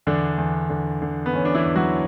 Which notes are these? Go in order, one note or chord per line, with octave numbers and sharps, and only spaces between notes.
E2 D3 D4
E2
D3
D3
B3
E2 C#4
D4
E3 E4
E2
F#3 F#4